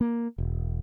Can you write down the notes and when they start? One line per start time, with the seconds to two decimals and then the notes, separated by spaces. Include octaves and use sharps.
0.01 A#3
0.38 E1